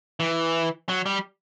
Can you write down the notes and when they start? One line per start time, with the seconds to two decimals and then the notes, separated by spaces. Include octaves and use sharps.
0.20 E3
0.89 F#3
1.06 G3